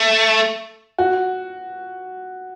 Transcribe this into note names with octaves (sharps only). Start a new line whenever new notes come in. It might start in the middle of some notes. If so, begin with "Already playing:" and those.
Already playing: A3
F#4